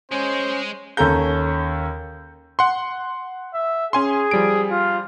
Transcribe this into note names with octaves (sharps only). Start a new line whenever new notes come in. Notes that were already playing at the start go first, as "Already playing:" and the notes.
G#3 C#4 G#4 C5
D#2 C#4 A4 A#5 G6
F#5 C6
E5
C#4 G#4 G#5 C6
F3 G3 D7
F4